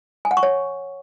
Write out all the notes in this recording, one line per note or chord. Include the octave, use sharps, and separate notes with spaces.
G#5
F#5
C#6
C#5